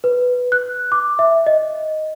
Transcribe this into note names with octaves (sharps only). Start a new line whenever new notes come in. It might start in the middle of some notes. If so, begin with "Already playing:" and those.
B4
F#6
D6
E5
D#5